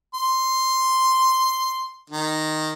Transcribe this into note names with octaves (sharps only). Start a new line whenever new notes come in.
C6
D#3